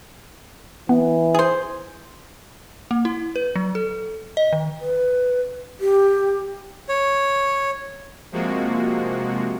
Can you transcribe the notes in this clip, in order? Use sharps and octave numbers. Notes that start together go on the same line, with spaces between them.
E3 B3
G#4 C5
A#3
E4
B4
F#3
A4
D#5
D#3
B4
G4
C#5
C3 F3 G#3 A#3 F#4